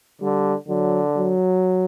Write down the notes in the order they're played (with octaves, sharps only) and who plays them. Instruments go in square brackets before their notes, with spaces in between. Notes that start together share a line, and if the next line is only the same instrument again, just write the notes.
[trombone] D3 [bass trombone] G3
[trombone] D3 [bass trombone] F#3
[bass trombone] F#3